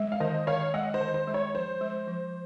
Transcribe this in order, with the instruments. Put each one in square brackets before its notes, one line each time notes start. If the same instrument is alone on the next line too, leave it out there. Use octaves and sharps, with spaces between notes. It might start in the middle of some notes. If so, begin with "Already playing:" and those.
Already playing: [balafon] G#3
[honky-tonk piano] F5
[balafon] D#3 [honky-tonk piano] C5 D#5
[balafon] D#3 [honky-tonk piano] C#5 F5
[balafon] G#3 [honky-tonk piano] D#5 F#5
[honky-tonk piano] C5 D#5
[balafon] D#3
[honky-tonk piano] C5
[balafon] G#3
[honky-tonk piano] C#5
[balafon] F3 [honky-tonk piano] C5
[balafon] G#3
F3